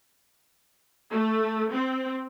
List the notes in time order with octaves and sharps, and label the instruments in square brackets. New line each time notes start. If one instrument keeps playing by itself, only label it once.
[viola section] A3
C4